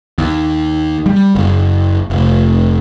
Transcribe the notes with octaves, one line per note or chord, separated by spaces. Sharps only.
D#2
G3
F#1
F1